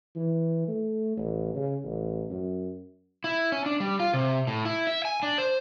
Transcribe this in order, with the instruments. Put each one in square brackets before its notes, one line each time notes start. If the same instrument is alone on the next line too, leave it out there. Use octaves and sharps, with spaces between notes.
[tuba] E3
A3
A1
C#3
A1
F#2
[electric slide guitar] E4
C#4
D4
G3
F4
C3
A2
E4
E5
G#5
D4
C5